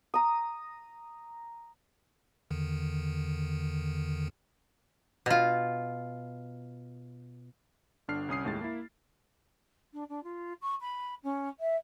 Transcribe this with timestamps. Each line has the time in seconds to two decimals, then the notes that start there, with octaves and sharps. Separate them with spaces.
0.14 A#5 D#6
2.51 E2 D3 D#3
5.26 B2 F4
8.08 G1 D3 D4 F6 C7
8.29 C2 C#4 D#6 C7
8.45 D#2 A2 G#3 A6
8.61 A#3 E4
9.93 D4
10.09 D4
10.24 F4
10.62 C#6
10.81 B5
11.23 C#4
11.60 E5